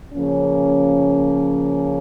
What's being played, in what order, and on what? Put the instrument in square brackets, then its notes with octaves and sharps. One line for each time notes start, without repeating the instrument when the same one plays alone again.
[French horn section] C#3 F3 A#3 C#4